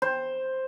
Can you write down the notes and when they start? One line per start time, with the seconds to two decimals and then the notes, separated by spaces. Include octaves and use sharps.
0.02 C5